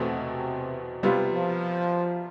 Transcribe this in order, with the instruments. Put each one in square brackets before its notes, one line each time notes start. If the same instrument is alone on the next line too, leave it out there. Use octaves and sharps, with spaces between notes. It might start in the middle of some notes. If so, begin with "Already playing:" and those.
Already playing: [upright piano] E2 B2 A3 C4
[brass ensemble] C3
[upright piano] C3 G3 B3 F4
[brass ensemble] F3